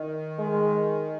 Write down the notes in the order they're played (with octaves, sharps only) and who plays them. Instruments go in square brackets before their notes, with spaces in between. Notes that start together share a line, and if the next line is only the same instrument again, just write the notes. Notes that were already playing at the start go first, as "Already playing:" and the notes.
Already playing: [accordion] D#3
[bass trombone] G#3